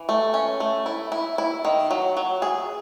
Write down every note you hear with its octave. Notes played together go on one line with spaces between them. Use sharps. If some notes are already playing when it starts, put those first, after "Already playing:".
Already playing: E3
A3
C#4
A3
E4
E4
E4
D#3
F#3
F#3
G#4